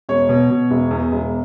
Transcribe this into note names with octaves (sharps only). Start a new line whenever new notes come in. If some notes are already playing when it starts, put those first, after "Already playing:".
E1 C#5
B2
B2
E1
E2
E1